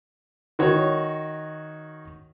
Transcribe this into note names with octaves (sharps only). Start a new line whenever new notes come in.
D#3 F#4 C#5